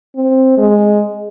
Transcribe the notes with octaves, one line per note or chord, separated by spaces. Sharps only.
C4
G#3